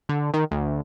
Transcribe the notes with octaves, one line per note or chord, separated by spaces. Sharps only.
D3
D#3
D2